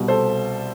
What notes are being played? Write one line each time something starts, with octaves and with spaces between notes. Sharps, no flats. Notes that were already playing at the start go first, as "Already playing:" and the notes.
Already playing: C2 B2 G3
A4 C5